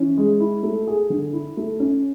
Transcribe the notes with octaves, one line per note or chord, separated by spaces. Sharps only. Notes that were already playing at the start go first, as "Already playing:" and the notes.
Already playing: E3 C#4
G#3
E4
A3
G#4
D3
E4
A3
C#4